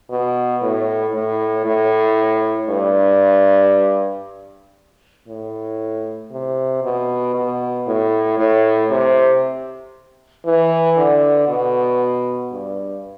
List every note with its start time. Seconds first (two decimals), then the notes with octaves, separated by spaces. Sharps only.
0.10 B2
0.62 A2
1.14 A2
1.65 A2
2.69 G2
5.28 A2
6.32 C3
6.83 B2
7.34 B2
7.87 A2
8.38 A2
8.90 C3
10.46 E3
10.97 D3
11.48 B2
12.51 G2